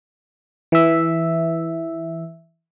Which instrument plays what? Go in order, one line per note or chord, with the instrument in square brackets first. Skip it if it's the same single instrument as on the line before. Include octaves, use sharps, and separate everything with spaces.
[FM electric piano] E3 E5